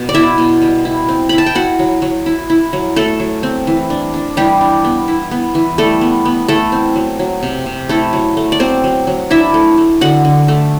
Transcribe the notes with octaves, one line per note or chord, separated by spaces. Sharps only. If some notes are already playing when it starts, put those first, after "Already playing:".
Already playing: B2
D5
B3 E4 E5
B2
G3
E4
C4
E4 B5
A5
G5
E4 F#4 F#5
F#3
F#3
E4
E4
F#3
F#3 A3 A4
F#3
C4
E3
D4
D4
E3 G3 G4
D4
B3
E4
B3
E3
G3 A3 A4
B3
B3
A3 E4 A4
C4
F#3
F#3
C3
C3
A3 E4 A4
F#3
A3
D5
F#3 C4 C5
F#3
F#3
D4 E4 E5
A3
A3
D3 F#4 F#5
D3
A3